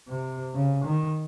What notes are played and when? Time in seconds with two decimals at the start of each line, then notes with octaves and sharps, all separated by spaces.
0.08 C3
0.54 C#3
0.84 D#3